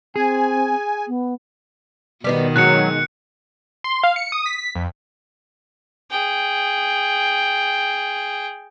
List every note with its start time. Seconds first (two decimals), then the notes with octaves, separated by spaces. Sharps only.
0.16 C4 G#4 G#5
1.08 B3
2.24 B2 D#3 G3 B3 D#4
2.56 F#3 G#3 D#4 F#6 C#7
3.84 C6
4.04 F5
4.16 C#7
4.32 D#6
4.46 B6
4.75 F2
6.11 G#4 G5